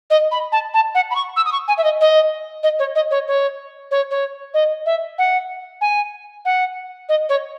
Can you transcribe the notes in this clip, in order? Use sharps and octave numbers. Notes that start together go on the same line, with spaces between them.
D#5
B5
A5
A5
F#5
B5
C#6
E6
D#6
C#6
G#5
E5
D#5
D#5
D#5
C#5
D#5
C#5
C#5
C#5
C#5
D#5
E5
F#5
G#5
F#5
D#5
C#5